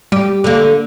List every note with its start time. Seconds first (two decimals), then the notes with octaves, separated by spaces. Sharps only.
0.12 G3 G4
0.44 D3 A#3